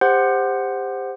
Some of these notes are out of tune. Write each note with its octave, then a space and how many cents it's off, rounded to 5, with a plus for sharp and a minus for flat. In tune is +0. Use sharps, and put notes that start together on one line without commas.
G4 +30 C5 +0 F#5 +0